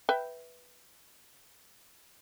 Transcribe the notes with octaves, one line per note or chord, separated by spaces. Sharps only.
B4 E5 G5